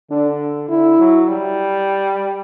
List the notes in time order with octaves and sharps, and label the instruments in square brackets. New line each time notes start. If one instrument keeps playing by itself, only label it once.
[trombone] D3 [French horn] D4
[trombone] D3 [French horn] E4
[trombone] F#3
G3